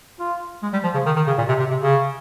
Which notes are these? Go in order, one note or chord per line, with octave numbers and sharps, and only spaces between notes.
F4
G#3
G3
F3
C#3
D#3
D#3
C#3
A#2
C3
C3
C3
C#3